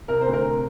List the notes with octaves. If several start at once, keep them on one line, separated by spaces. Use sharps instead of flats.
C3 A#4
C5
D2
A#4
C3